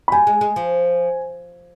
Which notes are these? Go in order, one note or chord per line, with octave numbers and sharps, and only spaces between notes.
B5
G3 G#5
G#3
G#3
F3